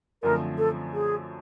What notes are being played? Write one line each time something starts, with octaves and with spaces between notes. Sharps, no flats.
F#2 D3 F3 A3 C4 A#4
A4
G#4